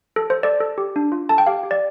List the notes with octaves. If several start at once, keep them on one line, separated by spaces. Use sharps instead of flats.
A4
C5
A4 D5
A4
G4
D4
F4
A4 A5
G5
G4 F5
G4
D5